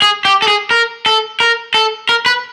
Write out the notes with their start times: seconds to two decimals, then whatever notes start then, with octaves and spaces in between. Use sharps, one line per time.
0.02 G#4
0.25 G4
0.42 A4
0.48 G#4
0.71 A#4
1.06 A4
1.40 A#4
1.74 A4
2.09 A#4
2.26 B4